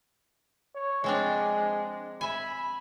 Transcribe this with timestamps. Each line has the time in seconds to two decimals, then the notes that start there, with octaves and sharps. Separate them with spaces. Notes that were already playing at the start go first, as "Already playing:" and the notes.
0.75 C#5
1.04 F3 G#3 C4 D4
2.21 E5 G#5 B5